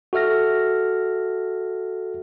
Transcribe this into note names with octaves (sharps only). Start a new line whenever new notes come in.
F#4 A4 E5 F6 A#6